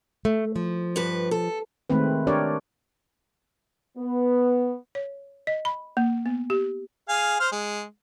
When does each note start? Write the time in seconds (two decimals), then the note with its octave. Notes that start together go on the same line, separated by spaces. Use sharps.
0.25 A3
0.56 F3
0.96 G2 B4
1.31 A4
1.90 D#3 G#3 A3 C4 B4
2.27 D4 G4 A#4 C#5 D5
3.97 B3
4.95 C#5
5.47 D#5
5.65 B5
5.97 A#3
6.26 B3
6.50 G4
7.09 G#4 F5 G#5
7.40 C5 F6
7.52 G#3